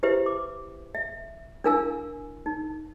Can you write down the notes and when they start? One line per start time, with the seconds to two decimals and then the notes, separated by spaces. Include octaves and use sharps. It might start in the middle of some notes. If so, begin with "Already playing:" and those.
0.03 E4 G4 B4 C5 E5
0.26 D6
0.95 E5
1.64 D4 E4 A#4 F5 G#5 E6
2.46 D#4